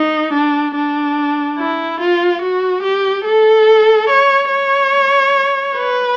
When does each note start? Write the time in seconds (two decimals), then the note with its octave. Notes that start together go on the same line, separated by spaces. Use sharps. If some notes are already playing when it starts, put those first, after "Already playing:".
Already playing: D#4
0.33 D4
0.76 D4
1.58 E4
2.01 F4
2.42 F#4
2.83 G4
3.25 A4
4.10 C#5
4.52 C#5
5.76 B4